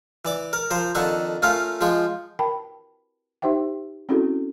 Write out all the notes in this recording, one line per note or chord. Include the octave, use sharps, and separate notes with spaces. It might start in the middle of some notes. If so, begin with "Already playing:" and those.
E3 D5 D6
A#4
F3 A#4 C5
F2 D#3 D4 A4 F#5 C#6
A3 C#4 F4 A#4 F5
F3 G#3 F4 G5 C#6
A#4 G5 A5 B5
D#4 G4 C5 E5 G5
C4 C#4 E4 F#4 G#4 A4